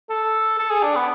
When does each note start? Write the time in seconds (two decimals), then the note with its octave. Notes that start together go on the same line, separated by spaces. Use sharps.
0.10 A4
0.59 A4
0.70 G#4
0.83 D4
0.96 B3